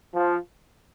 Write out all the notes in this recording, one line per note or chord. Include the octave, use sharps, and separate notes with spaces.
F3